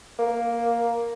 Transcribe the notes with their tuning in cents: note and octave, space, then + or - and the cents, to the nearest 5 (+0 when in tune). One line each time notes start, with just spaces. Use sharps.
A#3 +5